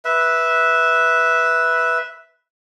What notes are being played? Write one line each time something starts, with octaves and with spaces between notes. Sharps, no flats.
B4 E5